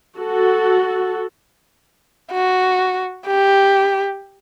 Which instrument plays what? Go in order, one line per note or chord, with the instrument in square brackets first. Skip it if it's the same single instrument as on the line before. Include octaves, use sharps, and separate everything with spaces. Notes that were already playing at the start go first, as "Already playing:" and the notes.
[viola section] F#4 A4
[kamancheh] F#4
G4